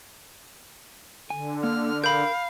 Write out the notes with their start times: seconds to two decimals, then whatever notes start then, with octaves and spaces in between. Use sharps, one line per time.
1.30 D3 G#5
1.64 A#3 F6
2.04 A#4 F5 B5 G6